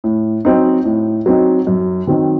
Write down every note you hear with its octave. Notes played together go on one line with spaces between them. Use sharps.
A2
F#3 C4 D#4
A2
F#3 C4 D#4
F#2
D#3 F#3 C4 D#4